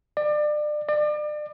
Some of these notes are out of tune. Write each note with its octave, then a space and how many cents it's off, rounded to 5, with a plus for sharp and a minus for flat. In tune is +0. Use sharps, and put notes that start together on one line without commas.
D5 +30
D5 +35